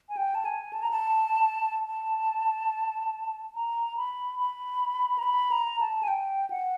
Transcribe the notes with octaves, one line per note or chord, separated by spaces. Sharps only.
G#5
G5
A5
G#5
A5
A#5
A5
A5
A#5
B5
B5
A#5
B5
A#5
A5
G#5
G5
F#5